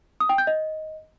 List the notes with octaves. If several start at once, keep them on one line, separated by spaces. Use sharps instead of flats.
D#6
G5
G6
D#5